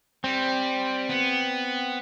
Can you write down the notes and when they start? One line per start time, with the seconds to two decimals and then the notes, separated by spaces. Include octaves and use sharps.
0.24 G3 C4
1.09 B3